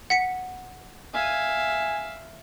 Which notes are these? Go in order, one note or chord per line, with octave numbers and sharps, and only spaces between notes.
F#5 B6 C#7
E5 F5 G#5